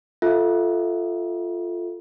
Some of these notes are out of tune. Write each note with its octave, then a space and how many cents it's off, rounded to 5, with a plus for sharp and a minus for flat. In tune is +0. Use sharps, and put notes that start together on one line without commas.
F4 +0 A4 +0 E5 -25